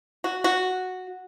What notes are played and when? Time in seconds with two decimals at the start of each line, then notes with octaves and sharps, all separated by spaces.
0.24 F#4
0.44 F#4